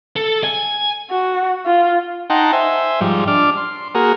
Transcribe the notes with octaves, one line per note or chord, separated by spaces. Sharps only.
A4
G#5
F#4
F4
D#4 F#5 G5 A5 A#5 C6
C5 E5 G#5
G#2 F3 G3
D4 D6 F6
C6
A#3 F#4 G#4 A#4